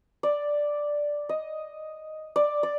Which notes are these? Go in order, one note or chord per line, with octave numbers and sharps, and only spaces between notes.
D5
D#5
D5
D5